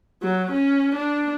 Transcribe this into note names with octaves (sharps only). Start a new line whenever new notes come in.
F#3
C#4
D4